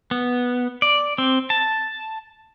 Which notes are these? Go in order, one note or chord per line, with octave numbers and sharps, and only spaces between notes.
B3
D5
C4
A5